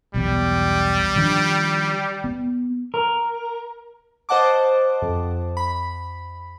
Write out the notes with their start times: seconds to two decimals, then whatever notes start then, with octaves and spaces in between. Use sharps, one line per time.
0.14 B1 E2 G3
1.16 D#3 F3 D4
2.24 B3
2.94 A#4
4.29 C5 D#5 F#5 A5 D6
5.02 F2
5.57 B5